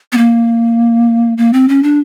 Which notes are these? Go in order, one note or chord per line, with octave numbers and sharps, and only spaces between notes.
B3
A#3
A#3
C4
C#4
D4